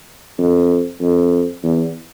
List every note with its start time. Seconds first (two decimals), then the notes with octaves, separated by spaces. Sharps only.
0.38 F2
1.01 F2
1.63 E2